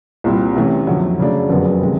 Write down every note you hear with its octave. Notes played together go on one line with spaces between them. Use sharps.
C2 A#2 G3 C4 E4
C3 E3 A3 C#4
F2 D3 F#3
F#2 C#3 F#3 A3 D4
F#1 F2 D3 F#3 B3
C3 D#3 G#3